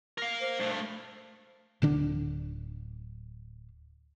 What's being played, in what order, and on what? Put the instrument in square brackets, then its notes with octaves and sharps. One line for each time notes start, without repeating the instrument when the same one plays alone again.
[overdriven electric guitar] A#4 F5
[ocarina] C5
[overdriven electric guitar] G2 A3
[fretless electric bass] D1 D3 D4